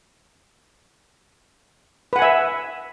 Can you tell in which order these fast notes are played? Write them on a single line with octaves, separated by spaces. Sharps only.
B4 F#5 G#5 E5